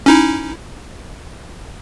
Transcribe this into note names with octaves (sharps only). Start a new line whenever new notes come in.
C#4 D#4 E4